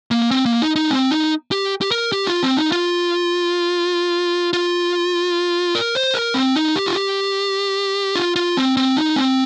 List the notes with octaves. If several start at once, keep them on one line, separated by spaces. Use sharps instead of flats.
A#3
C4
A#3
D#4
D#4
C4
D#4
G4
G4
A#4
G4
F4
C4
D#4
F4
F4
A#4
C5
A#4
C4
D#4
G4
F4
G4
F4
F4
C4
C4
D#4
C4